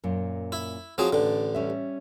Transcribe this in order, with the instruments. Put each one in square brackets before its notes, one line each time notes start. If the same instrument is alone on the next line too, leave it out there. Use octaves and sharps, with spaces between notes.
[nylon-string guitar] F#2 A#2
[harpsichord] E4
[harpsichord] F3 F#3 G#4 [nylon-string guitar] C4
[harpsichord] A1 D3 [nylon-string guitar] D4
[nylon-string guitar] G3 C#4 E5